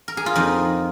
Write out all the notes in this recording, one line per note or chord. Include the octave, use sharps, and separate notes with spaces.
A#4
G#4
F4
F2 D#4